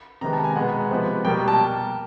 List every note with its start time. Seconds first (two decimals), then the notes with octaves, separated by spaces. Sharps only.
0.21 C3 D#3 G#3 B3 A#5
0.33 A5
0.44 G#5
0.56 B2 G#3 B3 F#5
0.91 C3 F3 G#3 B3
1.25 B2 G3 A#3 G5
1.48 A5